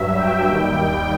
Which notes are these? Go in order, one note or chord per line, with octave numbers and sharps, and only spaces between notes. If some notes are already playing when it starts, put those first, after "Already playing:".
Already playing: G2 F#3 E5
G5
D#2 D#3 G3